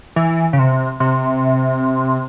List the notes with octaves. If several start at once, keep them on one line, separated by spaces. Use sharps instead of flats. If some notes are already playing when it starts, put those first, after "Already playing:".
E3
C#3
C3
C3